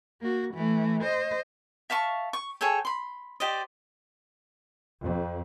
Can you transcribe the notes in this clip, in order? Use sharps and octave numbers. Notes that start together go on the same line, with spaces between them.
A#3 F#4
E3 A3
C5 D#5
E5 F5 A5 C#6
C#6
G#4 A4 C#5 G5
B5 C6
G4 C5 D5 D#5
F2